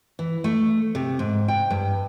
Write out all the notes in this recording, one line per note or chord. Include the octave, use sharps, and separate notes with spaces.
E3
A3
C3
G#2
G5
G2